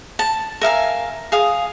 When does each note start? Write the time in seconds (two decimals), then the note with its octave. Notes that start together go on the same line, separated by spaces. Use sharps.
0.19 A5
0.61 A#4 E5 F5 G#5
1.32 G#4 F5 D#6